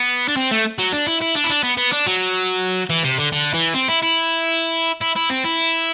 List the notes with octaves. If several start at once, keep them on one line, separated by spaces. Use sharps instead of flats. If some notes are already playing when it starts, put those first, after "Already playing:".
Already playing: B3
D4
C4
A3
F#3
D4
E4
E4
D4
E4
D4
B3
B3
D4
F#3
E3
C3
D3
D3
E3
C4
E4
E4
E4
E4
C4
E4